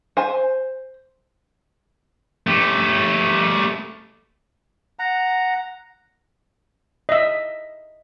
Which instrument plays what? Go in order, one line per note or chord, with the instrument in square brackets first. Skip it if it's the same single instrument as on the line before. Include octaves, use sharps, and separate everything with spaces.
[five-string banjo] C5 G#5
[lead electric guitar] A3 G4
[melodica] F#5 A#5
[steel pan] D#5 E5